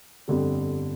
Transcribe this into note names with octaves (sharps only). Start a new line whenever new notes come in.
G1 F2 D3 G3